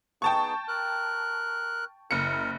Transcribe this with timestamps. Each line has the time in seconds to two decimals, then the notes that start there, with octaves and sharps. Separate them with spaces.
0.22 B3 D#4 G#4 G5 A5 C#6
0.68 A#4 F#6
2.11 F#1 E4 A#4 C#7